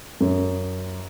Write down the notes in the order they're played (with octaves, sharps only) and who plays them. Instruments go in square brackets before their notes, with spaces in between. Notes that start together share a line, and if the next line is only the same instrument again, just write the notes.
[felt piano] F#2